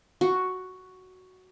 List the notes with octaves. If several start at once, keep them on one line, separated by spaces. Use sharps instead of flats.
F#4